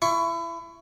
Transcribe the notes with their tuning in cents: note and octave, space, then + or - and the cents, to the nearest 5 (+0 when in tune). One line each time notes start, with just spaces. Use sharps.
E4 +30 C#6 +0